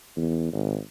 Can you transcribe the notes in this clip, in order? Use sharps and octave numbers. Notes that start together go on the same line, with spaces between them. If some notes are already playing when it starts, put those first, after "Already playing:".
E2
G#1